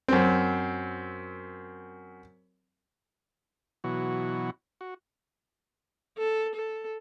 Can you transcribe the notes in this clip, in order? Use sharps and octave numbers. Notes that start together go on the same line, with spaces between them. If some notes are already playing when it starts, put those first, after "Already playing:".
F#2 C4
B2 E3 F#3 F#4
F#4
A4
A4